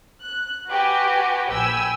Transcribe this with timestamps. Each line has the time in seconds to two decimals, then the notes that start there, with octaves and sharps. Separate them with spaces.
0.22 F#6
0.70 F#4 G4 B4 G#5
1.50 A#1 G5 G#5 B5 E6